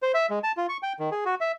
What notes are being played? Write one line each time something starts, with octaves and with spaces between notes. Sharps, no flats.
C5
E5
G#3
A5
F4
C#6
G5
D#3
G#4
F#4
E5